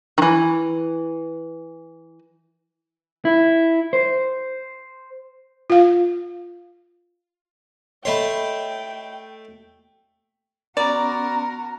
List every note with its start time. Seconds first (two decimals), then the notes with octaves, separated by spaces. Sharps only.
0.18 D#3 E3
3.25 E4
3.93 C5
5.70 F4 F5
8.05 A3 C#5 D#5 G5 B5 C6
10.77 B3 C#4 F#4 A#4 D5 A#5